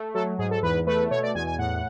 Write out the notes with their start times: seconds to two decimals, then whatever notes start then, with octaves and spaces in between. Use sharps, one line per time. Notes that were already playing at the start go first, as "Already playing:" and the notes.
Already playing: A3
0.15 F#3 A4
0.39 G#2 G#4
0.51 A4
0.62 E2 B4
0.87 A3 B4
1.11 B2 C#5
1.23 D5
1.35 E2 G#5
1.47 G#5
1.58 A2 F#5